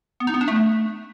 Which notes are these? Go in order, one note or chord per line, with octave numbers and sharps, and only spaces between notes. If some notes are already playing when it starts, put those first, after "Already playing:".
B3
D#4
B3
D4
A3